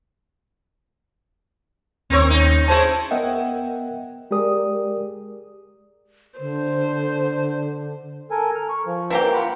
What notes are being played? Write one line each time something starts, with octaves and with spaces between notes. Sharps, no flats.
D#2 C4 A#4 C#5
C#4 D#4
C#4 E4 G#4 C5 A5
B3 A#4 D#5 E5 F#5 G5
G#3 G4 G#4 A#4 D5 D#6
D3 C5
A4 A#4 G#5
F6
C#6
F3
E3 A#3 G4
F4 F#5 B5